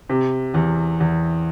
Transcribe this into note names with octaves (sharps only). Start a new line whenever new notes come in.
C3
E2
E2